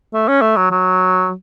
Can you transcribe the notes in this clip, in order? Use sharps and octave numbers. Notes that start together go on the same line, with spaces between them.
A3
C#4
A3
F#3
F#3